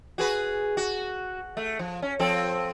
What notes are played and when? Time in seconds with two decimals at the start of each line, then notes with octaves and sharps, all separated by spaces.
0.18 F#4 G#4 B4
0.77 F#4
1.57 A3
1.79 F3
2.02 C#4
2.19 F3 C4 A4